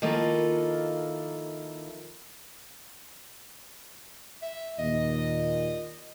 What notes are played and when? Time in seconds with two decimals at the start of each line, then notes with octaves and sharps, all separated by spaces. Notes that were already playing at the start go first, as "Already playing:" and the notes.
0.02 D#3 F3 A#3 E4 F4 A4
4.42 E5
4.79 D#2 A#2 D#5